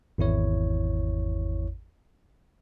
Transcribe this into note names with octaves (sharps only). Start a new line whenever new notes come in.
G#1 E2 E4 C#5